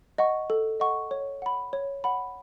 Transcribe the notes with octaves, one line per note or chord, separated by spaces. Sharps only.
D#5 F#5 C#6
A4
D#5 F#5 C#6
C#5
F#5 B5
C#5
F#5 B5